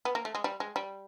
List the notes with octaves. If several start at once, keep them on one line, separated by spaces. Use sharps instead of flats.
B3
A#3
A3
G#3
G3
G#3
G3